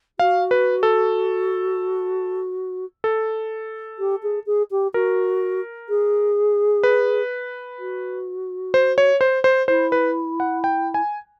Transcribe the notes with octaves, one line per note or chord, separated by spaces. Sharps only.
F#4 F5
B4
A4
A4
G4
G#4
G#4
G4
F#4 A#4
G#4
B4
F#4
C5
C#5
C5
C5
E4 C5
B4
F#5
G5
G#5